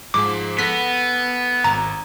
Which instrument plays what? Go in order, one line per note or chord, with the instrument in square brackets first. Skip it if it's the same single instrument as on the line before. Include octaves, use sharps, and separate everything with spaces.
[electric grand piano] G#2 F3 G#3 [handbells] D6
[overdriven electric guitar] B3 [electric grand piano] A4 A#6 [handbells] B6
[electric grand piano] G#1 [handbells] A#5